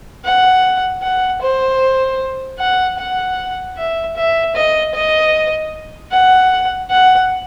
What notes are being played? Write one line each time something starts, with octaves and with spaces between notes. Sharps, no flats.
F#5
F#5
C5
F#5
F#5
E5
E5
D#5
D#5
F#5
F#5